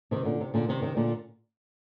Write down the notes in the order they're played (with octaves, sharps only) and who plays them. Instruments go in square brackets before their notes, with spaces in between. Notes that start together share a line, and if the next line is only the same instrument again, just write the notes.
[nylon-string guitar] C3 D#3
A#2 D3
C3
A#2 D3
C3 D#3
C3 D#3
A#2 D3